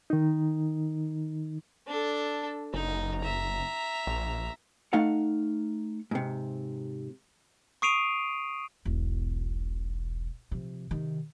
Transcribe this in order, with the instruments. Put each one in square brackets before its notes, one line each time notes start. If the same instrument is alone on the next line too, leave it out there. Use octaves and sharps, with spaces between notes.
[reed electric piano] D#3 D#4
[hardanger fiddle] D4 A4
[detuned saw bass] F#1 [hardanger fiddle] D#4
[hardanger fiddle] E5 A#5
[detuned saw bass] A#1
[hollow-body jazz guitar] A3 D#4 F5 F#5
G#2 C3
[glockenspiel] C#6 D#6 C7 D7 D#7 F7
[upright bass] E1 B1
C3 F3
C3 D#3